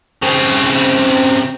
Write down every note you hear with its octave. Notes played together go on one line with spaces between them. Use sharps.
C#3 C4